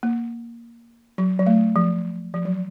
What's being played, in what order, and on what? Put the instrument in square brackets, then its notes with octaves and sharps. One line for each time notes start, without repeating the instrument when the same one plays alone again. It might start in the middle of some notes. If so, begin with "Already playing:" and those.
[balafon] A#3
F#3
F#3
A3
F3
F3
F#3